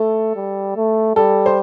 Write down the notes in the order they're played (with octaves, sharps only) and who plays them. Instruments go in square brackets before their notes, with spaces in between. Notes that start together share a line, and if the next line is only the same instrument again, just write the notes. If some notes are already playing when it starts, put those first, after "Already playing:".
Already playing: [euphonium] A3 [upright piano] A4
[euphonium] G3
A3
[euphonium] G3 [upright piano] A4
[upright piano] C5